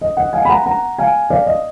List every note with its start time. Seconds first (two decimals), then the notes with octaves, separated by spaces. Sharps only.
0.01 D#5
0.17 D#5 F#5
0.33 F5 G#5
0.45 B5
0.49 F#5 A#5
0.66 F#5 A#5
0.98 F5 G#5
1.30 D5 F5
1.46 D#5